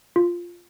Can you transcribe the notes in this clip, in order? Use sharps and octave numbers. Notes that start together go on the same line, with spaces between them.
F4